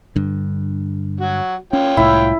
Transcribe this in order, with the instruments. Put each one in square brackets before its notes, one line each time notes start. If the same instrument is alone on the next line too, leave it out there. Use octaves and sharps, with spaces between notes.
[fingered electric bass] G2 D3
[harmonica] F#3 F#4
[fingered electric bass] C#4 [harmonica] F4 C#5 G5
[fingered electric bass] C2 A2 [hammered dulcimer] E4